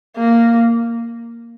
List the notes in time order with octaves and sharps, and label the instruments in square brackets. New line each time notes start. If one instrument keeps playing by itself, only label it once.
[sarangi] A#3